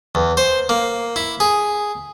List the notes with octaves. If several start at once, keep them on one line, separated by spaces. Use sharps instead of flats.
E2
C5
A#3
E4
G#4